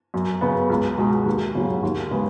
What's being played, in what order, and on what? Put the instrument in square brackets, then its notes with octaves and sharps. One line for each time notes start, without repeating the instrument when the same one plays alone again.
[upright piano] F#2
C#3 B3
C#2
B2 G#3
D#2
C#3 F#3
D#2
C#3 G#3 B3